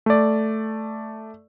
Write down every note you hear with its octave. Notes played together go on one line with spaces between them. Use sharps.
A3 D5